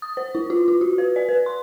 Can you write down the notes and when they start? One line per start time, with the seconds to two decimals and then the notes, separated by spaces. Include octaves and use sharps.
0.02 D#6
0.17 C5
0.35 E4
0.50 F4
0.68 F4
0.81 F#4
0.98 B4
1.16 D5
1.29 B4
1.46 C6